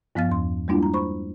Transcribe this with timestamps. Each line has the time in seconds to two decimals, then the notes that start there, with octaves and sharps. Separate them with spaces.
0.15 G2 F3 B3 F5 F6 A6
0.29 E2 C6
0.68 G3 G#3 A#3 D4 E4 F4
0.83 A#5
0.94 C5 B5 C#6